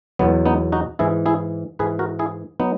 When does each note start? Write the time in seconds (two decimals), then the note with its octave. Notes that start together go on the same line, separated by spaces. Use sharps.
0.19 E2 B2 F#3 B3
0.46 B3 D#4
0.72 D#4 F#4
0.99 G#2 E3 E4 G#4
1.26 E4 G#4
1.79 G#2 E3 G#4 B4
1.99 F#4 A#4
2.19 E4 G#4
2.60 F#3 B3 D#4